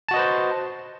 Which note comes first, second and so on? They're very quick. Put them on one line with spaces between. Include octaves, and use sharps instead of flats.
A5 F#4 D#5 B4 C5